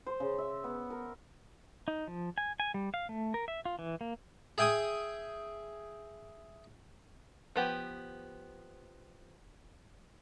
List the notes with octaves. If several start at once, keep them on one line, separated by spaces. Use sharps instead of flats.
C5
C#3
E5
B3
A#4
D#4
F3
G#5
G#5
G3
F5
A3
A#4
E5
F4
E3
A#3
G#4 E5 G5 G#5 D#6
F3 B3 G4